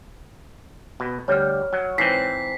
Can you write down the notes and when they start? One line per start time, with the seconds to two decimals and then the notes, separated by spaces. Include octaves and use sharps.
1.00 B2
1.28 D2 G3 C#5 F6
1.73 F#3
1.98 G#2 E3 C4 B6 C7